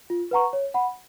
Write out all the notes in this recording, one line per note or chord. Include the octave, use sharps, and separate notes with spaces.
F4
B4 F#5 A#5 C#6
C#5
F#5 B5